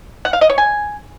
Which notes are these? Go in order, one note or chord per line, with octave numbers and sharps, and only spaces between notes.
F#5
F5
D#5
C#5
G#5